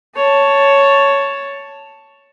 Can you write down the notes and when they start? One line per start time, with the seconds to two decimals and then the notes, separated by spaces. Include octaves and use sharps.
0.16 C#5 A5